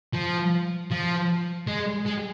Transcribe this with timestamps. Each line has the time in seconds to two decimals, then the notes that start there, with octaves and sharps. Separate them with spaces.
0.13 F3
0.91 F3
1.67 G#3
2.06 G#3